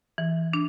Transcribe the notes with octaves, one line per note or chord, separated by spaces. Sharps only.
E3
D4